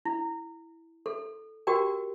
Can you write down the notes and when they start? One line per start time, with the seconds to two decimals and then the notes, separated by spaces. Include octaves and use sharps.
0.05 E4
1.06 A4
1.67 F#4 G4 A#4 G5